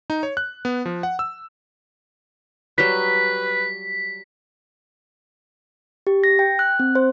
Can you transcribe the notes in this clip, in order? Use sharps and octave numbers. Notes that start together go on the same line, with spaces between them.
D#4
C#5
F#6
B3
F3
F#5
E6
F#3 G3 B4 B6
G4
A#6
G5
F#6
C4
C5